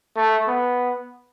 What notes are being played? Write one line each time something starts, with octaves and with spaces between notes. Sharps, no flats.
A3
B3